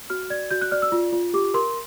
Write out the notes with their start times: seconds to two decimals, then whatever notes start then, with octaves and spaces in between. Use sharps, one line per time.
0.10 F#4 F6
0.30 D5 G#6
0.51 F#4 G6
0.61 F#6
0.71 D5 F6
0.82 E6
0.92 F4
1.12 F4
1.34 G4 D6
1.54 A#4 C6